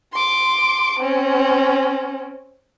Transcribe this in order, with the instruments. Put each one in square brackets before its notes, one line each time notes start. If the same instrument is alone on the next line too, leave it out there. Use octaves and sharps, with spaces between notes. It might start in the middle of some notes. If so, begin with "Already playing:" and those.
[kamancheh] C6 D6
C4 C#4